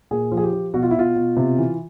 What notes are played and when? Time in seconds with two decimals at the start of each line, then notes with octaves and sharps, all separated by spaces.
0.11 A#2 G#4
0.32 F3
0.37 G#4
0.43 G4
0.53 F3
0.74 B2 F#4
0.82 F4
0.91 E4
0.95 B2 F4
1.16 B2
1.37 C3
1.58 E3